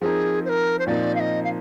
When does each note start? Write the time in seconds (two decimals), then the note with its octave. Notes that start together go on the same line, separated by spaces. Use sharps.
0.01 F3 C4 D#4 G#4 A#4
0.44 C5
0.49 A#4
0.78 C5
0.86 A#2 F3 C4 D#4 A#4 D5
1.15 F5
1.19 D#5
1.43 F5